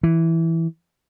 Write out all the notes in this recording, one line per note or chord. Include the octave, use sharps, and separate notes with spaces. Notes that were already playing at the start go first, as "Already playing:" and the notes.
E3